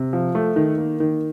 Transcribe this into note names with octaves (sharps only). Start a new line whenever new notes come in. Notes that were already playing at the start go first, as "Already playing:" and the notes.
Already playing: C3
F3
A3
D#3
A#3
D#3